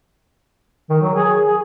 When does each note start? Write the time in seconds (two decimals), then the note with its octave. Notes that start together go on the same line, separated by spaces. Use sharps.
0.90 D#3
1.01 F#3
1.15 G#4
1.47 G#4